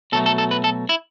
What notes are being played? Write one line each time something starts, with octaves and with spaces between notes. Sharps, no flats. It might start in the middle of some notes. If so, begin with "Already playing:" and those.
B2 F#3 A3 A4
A4
A4
B4
A4
E4